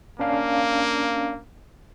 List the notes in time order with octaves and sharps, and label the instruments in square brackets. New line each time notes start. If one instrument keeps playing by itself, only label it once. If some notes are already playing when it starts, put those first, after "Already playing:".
[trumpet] A#3 [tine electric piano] C#4 D4 F5